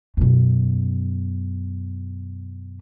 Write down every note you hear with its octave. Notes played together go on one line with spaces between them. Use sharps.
F#2 B2